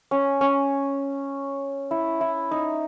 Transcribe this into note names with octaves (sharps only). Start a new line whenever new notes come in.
C#4
C#4
E4
E4
D#4